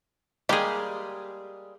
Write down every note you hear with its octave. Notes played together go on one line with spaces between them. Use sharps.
G3 G#3 A#3 G4 G#4